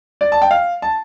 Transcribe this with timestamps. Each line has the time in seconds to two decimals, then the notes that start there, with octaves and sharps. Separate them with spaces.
0.21 D5
0.32 A5
0.42 G5
0.51 F5
0.82 A5